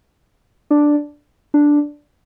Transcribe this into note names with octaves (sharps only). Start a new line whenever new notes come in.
D4
D4